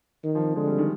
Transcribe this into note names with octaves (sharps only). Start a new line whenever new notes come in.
D#3
F3
D3 G#3
G3
D#3